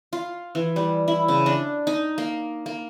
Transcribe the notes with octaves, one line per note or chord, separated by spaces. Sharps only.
F4
E3
G3
E4
C#3
D4
D#4
A#3
A#3